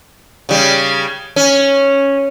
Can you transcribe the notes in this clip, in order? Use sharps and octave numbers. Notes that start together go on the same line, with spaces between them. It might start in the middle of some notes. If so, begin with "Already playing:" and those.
C#3 G3
C#4